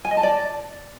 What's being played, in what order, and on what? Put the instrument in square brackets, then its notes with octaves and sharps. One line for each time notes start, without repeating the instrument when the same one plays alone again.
[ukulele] G#5
D#5
A5
D5